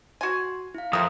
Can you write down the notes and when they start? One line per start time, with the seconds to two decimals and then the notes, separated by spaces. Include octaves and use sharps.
0.21 F#4 G#5 C6
0.75 E4 F5
0.93 F2 A#4 E5 D#6